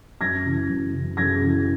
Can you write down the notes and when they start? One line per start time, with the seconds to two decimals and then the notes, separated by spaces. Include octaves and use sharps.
0.21 F#2 G#6 A#6
0.45 C#3 E3
0.69 F#2
0.94 C#3 E3
1.17 F#2 G#6 A#6
1.42 C#3 E3